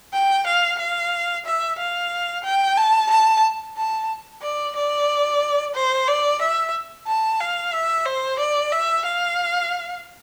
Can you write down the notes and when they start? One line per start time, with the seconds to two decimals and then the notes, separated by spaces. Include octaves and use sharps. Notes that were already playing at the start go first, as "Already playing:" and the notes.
0.13 G5
0.46 F5
0.79 F5
1.45 E5
1.78 F5
2.44 G5
2.77 A5
3.10 A5
3.77 A5
4.42 D5
4.75 D5
5.75 C5
6.08 D5
6.41 E5
7.07 A5
7.40 F5
7.73 E5
8.06 C5
8.39 D5
8.72 E5
9.05 F5